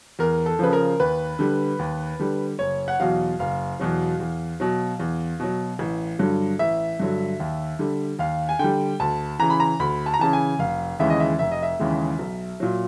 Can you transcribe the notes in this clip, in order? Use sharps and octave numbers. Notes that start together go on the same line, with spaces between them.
E2 A#4
A4
C#3 F3 B4
A#4
D#2 B4
D3 G3
D#2
D3 G3
F#1 C#5
F#5
E2 B2 F#3 F5
F#1 F5
E2 B2 F#3
E2
B2 F#3
E2
B2 F#3
A1
G2 D3 F#3
A1 E5
G2 D3 F#3
D#2
D3 G3
D#2 F5
G#5
D3 G3 G5
D2 A5
C#3 E3 A#5
B5
A#5
D2 B5
A5
A#5
C#3 E3 A5
G#5
F1 F5
D#2 C#3 E3 G#3 E5
D#5
E5
F1 E5
D#5
E5
D#2 C#3 E3 G#3
B1
A#2 F#3